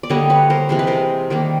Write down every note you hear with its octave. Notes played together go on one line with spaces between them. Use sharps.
D5
D3 G3 A#3 C#5 D#5
B4 C#5
A#4 C5
C3 E3 G#3 C5
B4
A#4 C5
D#3 G3 A#3